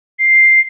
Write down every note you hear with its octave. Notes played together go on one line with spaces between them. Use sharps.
C7